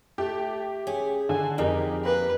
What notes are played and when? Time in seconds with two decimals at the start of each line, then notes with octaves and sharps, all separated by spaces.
0.18 A3 G4
0.87 C#4 G#4
1.29 D3 G#5
1.58 F2 D#4 G4 G#4 A#4
2.04 A#3 B4